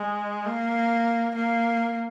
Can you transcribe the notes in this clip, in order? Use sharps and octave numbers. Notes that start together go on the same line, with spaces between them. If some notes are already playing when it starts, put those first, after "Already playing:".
Already playing: G#3
A#3
A#3